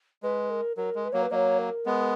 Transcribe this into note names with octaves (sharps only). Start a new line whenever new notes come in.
G#3 B4
A#4
F#3 A#4
G#3
B4
F#3 A#3 C#5
B4
F#3 A#3 C#5 D#5
A#4
G#3 B3